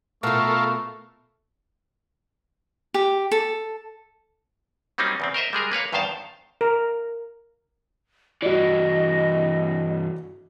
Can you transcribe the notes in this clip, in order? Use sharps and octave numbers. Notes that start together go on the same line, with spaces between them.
B2 A3 F4 A4 A#4 F5 C#6
G4
A4
F#3 G3 A#3 C4 C#4 D#4
E2 C#3 C4
A#4 C5 D#5 E5
G3 G#3 G#4 A#4
A#3 B4 C#5 F5
E2 G2 D#3 C5 F5 A5
A#4
G2 E3 F#4 D5 D#5